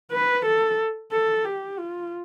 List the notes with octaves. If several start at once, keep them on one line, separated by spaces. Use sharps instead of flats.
B4
A4
A4
G4
F4